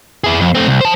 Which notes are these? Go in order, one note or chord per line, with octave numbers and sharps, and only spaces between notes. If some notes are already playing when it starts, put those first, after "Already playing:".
E4 G#4
F2
A3 C4
C2
C5 A5